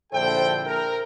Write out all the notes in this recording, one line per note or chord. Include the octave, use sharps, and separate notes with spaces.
A#1 D3 E4 A4 C5 G5
A#4